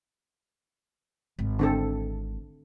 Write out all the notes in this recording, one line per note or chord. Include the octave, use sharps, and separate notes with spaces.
G#1
D3 C4 A4